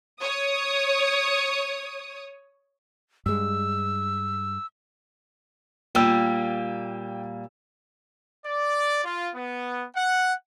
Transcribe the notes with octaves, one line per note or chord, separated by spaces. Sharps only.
C#5 D#6
G2 G#3 E6
A#2 G3 A#3 G5 E6
D5
F4
B3
F#5